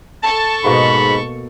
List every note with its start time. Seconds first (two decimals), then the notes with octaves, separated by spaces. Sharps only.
0.23 A4 A5 C#6
0.64 G#2 B2 A#3 F#4 B5